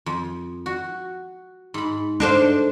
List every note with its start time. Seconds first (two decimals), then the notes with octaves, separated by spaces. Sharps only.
0.06 F2
0.66 F#4
1.74 G#2 B5
2.20 D4 A4 C5 D#5 F5